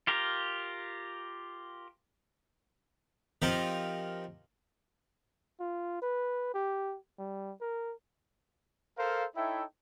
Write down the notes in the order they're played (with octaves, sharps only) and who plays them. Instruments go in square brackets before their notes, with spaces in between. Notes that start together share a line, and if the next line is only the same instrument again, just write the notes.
[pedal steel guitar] F4 G4 A#4
[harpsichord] F3 C4 D#4 F4 G4 A#4
[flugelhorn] F4
B4
G4
G3
A#4
[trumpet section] A4 A#4 C5 F5
D#4 E4 A4 C#5 E5 G5